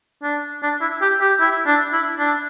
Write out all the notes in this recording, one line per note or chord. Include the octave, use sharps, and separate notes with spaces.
D4
D4
E4
G4
G4
E4
D4
E4
D4